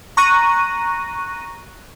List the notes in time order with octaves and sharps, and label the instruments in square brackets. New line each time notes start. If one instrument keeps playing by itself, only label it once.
[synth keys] A#5 C#6 F#6 A#6 D#7